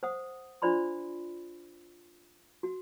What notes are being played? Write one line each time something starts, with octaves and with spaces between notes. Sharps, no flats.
C5 F#5 D#6
D4 F4 C5 D5 B5 C6
F#4